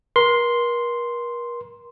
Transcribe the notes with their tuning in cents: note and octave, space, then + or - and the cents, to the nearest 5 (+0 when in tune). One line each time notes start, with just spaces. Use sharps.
A#4 +40 C6 +0